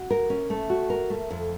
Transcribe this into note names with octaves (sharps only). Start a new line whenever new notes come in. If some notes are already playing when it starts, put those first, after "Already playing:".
Already playing: F#4
A#4
C#4
A3
F#4
A#4
A3
F2